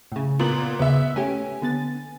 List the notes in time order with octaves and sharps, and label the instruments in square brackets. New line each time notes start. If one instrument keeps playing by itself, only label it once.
[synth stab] A2 C#3
[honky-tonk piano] A#2 B3 F#7
[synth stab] D#2 C#3 [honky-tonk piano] B3 E5
[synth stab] A3 C#4 G4 [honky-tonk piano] G#5
[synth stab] D3 B3 A6